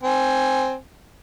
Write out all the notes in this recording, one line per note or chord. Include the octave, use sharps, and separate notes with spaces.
C4 G#5